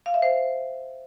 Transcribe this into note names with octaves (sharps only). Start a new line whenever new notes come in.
F5
E5
C5